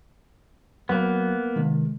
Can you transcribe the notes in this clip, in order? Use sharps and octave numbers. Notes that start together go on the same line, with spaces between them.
F#3 A#3 B3
C3 D#3 G#3